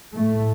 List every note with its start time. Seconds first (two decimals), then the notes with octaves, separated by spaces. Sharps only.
0.15 A2 A3